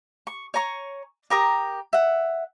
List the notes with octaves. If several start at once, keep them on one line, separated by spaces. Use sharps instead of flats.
C#6
C#5 G#5 A#5 C#6
G4 A#4 A#5 D#6
E5 F#5